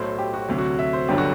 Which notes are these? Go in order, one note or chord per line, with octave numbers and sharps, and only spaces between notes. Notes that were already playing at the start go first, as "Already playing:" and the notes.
Already playing: B1 A2 F#3 C5
G4
F#4
D2 C3 F#3
F#4
E5
C5
G1 G2 D3 F#3 G4
F#4